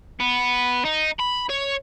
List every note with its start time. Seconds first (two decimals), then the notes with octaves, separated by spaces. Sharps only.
0.20 B3
0.85 D#4
1.20 B5
1.50 C#5